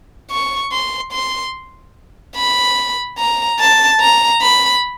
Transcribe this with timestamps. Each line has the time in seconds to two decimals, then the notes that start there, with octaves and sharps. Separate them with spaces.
0.31 C#6
0.72 C6
1.13 C6
2.36 B5
3.19 A#5
3.59 A5
4.01 A#5
4.42 B5